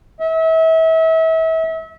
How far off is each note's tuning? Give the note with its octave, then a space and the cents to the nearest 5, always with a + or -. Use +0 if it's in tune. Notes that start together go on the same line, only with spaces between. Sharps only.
E5 -35